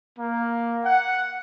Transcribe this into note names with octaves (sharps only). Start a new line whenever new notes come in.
A#3
F#5